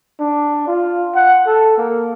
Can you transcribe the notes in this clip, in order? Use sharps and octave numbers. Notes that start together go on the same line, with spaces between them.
D4
F4
F#5
A4
A#3